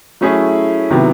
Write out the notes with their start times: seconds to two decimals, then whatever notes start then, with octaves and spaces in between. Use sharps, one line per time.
0.21 F#3 A3 C#4 E4 G#4
0.90 C3 D#3 F#3 B3 E4